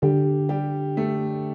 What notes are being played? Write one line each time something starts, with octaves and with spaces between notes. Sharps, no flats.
D3 G3 G4
G3 G4
A3 A4